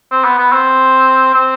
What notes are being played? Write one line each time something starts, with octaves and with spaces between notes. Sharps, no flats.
C4
B3
B3
C4
C4